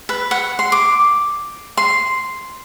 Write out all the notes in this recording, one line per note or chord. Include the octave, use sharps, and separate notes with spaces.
B4
F#5
C6
D6
C6